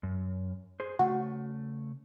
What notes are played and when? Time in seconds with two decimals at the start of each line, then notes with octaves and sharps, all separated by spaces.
0.03 F#2
0.80 G#4 C5
0.99 C#3 A3 F#4